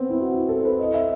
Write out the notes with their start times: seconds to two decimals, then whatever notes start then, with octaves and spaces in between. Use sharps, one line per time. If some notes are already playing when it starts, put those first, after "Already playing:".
Already playing: B3 C4
0.10 E4
0.20 F#4
0.34 E4
0.49 A4
0.60 C5
0.65 B4
0.79 D#5
0.94 E5